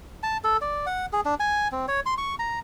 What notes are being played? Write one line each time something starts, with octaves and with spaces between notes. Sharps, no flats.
A5
A4
D5
F#5
G#4
D4
G#5
C4
C#5
C6
C#6
A#5